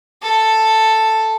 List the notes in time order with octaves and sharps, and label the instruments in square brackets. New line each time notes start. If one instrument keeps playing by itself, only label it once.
[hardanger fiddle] A4